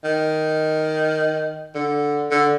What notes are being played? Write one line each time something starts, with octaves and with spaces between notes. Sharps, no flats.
D#3
D3
D3